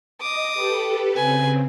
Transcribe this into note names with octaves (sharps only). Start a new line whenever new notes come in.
D#5 D6 D#6
G4 A4 B4
C#3 C4 B4 G#5